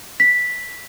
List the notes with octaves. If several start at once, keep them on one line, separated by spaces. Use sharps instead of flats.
B6